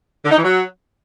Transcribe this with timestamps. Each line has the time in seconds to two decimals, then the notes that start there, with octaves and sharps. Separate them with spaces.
0.25 D3
0.31 D#4
0.37 E3
0.44 F#3